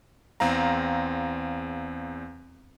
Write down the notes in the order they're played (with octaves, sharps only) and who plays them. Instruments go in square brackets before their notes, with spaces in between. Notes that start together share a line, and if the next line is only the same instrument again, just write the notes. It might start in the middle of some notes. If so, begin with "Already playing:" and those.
[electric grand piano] E2 C4 F5 A#5